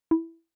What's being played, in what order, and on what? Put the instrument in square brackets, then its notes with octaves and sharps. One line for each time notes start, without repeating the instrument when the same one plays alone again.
[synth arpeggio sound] E4